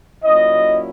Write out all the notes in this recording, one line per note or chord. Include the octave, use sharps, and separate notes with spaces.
A#2 F#3 C#4 E4 D#5